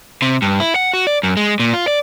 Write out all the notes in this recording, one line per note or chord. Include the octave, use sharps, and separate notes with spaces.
C3
G2
E4
F#5
F#4
D5
F#2
G#3
A#2
F4
D5